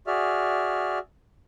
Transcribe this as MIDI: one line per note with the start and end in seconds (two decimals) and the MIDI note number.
0.07 0.99 66
0.07 0.99 68
0.07 0.99 74
0.07 0.99 76
0.07 0.99 89